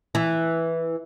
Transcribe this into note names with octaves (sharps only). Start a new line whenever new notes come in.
E3